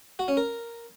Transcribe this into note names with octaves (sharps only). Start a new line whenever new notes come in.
F#4
C#4
A#4